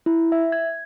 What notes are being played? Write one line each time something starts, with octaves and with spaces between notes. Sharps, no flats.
E4
E5
G#6